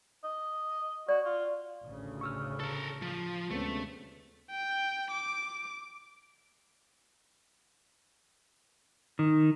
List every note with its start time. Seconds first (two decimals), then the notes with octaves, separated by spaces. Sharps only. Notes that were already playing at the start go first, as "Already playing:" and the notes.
0.24 D#5
1.09 F#4 D5
1.25 F4
1.82 A1 D2 C#3
2.21 C#6 E6 F6
2.60 A4 A#4
3.02 F3
3.51 D2 C3 G#3 A3 B3 C#4
4.51 G5
5.11 D6
9.19 D#3